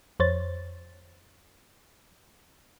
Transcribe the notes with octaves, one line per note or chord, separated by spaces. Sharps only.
F2 C5 C#5 A6